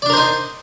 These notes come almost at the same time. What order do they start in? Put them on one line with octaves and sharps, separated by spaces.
D5 D4 A#4 C5 D#4